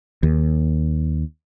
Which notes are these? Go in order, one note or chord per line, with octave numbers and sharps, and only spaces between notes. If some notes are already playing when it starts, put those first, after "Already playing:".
D#2